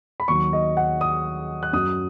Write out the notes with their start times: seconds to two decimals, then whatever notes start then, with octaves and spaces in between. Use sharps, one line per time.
0.20 B5
0.28 D#2 D#3 F#3 C#6
0.53 D#5
0.77 F#5
1.01 D#6
1.63 F#6
1.73 F#2 F#3 D#6